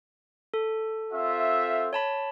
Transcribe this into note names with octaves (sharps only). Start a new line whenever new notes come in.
A4
C4 F4 E5
C#5 A5 B5